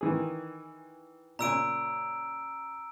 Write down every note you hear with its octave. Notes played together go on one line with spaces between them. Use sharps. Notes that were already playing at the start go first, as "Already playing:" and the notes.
D#3 E3 G#4
A#2 C#3 G#5 A#5 E6 D7